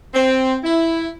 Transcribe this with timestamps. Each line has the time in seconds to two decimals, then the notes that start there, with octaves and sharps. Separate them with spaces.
0.15 C4
0.64 E4